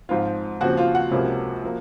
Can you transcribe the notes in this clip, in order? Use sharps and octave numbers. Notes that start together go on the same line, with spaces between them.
G#2 F3 C4 F4 F5
D#2 C#3 F3 C4 F#4 F#5
F4 F5
F#4 F#5
C#2 C3 F3 A#3 C#4
F3 A#3